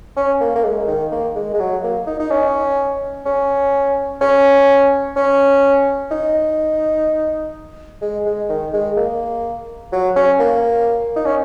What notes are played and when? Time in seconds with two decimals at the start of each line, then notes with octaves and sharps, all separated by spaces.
0.16 C#4
0.41 A#3
0.55 A#3
0.64 G#3
0.88 D#3
1.12 A#3
1.36 G#3
1.54 G#3
1.60 F#3
1.84 A#3
2.07 D#4
2.19 D#4
2.31 C#4
3.26 C#4
4.21 C#4
5.16 C#4
6.11 D#4
8.02 G#3
8.26 G#3
8.49 D#3
8.73 G#3
8.97 A#3
9.92 F#3
10.16 C#4
10.39 A#3
11.16 D#4
11.26 C#4